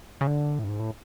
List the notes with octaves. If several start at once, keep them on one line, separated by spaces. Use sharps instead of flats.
C#3
D3
A2
G2
G#2
A2